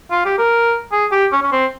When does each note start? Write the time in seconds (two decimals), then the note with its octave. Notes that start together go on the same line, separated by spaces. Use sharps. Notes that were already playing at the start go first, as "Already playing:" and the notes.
0.11 F4
0.26 G4
0.38 A#4
0.92 G#4
1.12 G4
1.32 C#4
1.43 C#4
1.52 C4